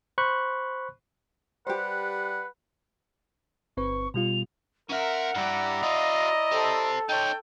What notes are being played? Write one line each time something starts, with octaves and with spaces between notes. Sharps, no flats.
C5 B5 C#6 F#6
G3 G4 B4 C5 F#5
G1 C4 B4 C#6
B2 G3 F4 F7
C#4 A#4 E5 F#5
G2 E4 G4 D5 A#5
F#4 D#5 F5
G4 A4 C5
D#4 C#5 G5